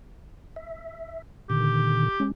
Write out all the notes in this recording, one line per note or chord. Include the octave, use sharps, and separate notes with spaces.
E5
A#2 D3 D#3 G4
G#3 C#4